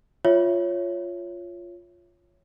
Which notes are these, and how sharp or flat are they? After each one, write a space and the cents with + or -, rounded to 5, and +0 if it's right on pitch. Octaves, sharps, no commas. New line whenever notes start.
F4 +0 C#5 +0 E5 +0